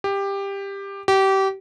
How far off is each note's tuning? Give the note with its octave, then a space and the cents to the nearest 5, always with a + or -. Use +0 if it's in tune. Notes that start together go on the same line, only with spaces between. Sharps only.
G4 +15
G4 -25